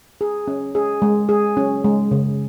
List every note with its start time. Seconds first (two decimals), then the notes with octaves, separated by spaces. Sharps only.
0.21 G#4
0.48 C#4
0.75 G#4
1.02 G#3
1.29 G#4
1.57 C#4
1.84 G#3
2.11 C#3